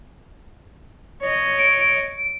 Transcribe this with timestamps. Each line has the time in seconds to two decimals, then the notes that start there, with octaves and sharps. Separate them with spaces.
1.22 C#5 D#5
1.58 D7